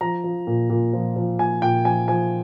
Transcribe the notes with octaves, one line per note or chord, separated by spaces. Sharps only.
F3 A#5
F3
A#2
A#2
F3
F3
A#2 G#5
A#2 G5
F3 G#5
F3 G#5